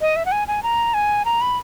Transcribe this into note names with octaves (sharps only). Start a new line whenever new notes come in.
D#5
E5
F#5
G#5
G#5
A#5
G#5
A#5
B5